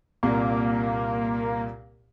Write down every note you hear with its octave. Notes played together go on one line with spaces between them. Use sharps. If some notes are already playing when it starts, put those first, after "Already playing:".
C2 A#2 A#3